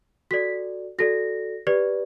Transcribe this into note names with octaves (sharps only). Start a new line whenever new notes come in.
F#4 A4 D5 B6
F#4 A4 D5 A#6
G4 B4 D5